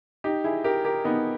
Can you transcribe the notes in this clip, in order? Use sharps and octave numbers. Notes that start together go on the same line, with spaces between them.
D#4 G4
E4 G#4
G4 A#4
G4 A#4
B3 D#4